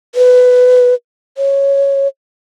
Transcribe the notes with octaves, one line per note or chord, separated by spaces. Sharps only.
B4
C#5